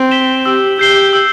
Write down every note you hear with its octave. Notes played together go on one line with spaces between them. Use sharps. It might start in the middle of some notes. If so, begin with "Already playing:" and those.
Already playing: C4
B6 E7 G7
G4 E6
G4 G6 C7 G7
E6